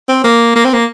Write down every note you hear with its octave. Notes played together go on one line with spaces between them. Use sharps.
C4
A#3
A#3
C4
A#3